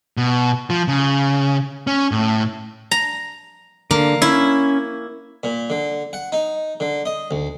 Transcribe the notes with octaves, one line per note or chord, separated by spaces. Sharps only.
B2
F3
C#3
C#4
A2
A#5
D3 A#3
C#4 E4
A#2
D3
F#5
D#4
D3
D#5
D2